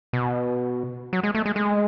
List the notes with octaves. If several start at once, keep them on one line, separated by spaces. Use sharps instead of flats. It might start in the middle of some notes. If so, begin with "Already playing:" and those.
B2
F#3
G#3
A3
G#3
G#3